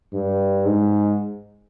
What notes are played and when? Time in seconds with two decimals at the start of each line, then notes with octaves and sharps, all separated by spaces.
0.13 G2
0.65 G#2